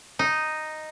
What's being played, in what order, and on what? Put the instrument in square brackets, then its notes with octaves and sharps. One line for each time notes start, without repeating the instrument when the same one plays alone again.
[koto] D#4